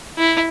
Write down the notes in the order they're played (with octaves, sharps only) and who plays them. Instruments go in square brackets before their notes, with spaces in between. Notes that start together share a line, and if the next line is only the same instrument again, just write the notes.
[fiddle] E4